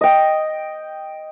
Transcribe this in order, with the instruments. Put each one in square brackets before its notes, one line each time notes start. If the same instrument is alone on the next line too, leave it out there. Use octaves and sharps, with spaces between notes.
[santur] D#5 G5